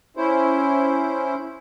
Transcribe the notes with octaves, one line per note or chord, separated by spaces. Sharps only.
C#4 E4 C5